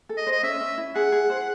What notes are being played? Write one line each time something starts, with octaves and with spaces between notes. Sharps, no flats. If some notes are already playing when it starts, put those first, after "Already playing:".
A4
D#5
C5
D#5
C#4 E5
C#4
E4
G#4 F#5
G#4
C5